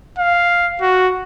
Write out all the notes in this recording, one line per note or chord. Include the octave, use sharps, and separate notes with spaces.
F5
F#4